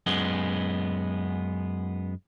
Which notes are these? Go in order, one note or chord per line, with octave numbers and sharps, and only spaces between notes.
F#2 G#3 B3